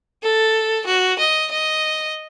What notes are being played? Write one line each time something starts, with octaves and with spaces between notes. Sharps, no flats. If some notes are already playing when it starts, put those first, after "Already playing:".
A4
F#4
D#5
D#5